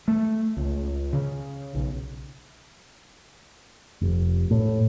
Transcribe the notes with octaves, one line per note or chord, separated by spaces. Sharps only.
A3
C#2
C#3
B1
F1
A2